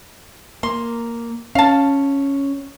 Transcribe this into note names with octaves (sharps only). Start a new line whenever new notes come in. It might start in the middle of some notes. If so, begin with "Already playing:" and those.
A#3 C6
C#4 F5 A5